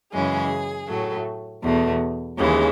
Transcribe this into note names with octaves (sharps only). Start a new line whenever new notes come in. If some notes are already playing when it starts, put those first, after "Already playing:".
F#2 C#3 E3 G#3 G#4
A2 F#3 A3
E2 B2 A3
D#2 C#3 E3 G#3